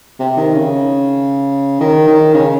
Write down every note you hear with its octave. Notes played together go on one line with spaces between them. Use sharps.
C3
D#3
C#3
D#3
D#3
C#3